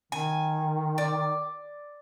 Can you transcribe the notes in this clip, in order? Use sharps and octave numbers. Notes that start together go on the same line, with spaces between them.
D#3 G#5
D5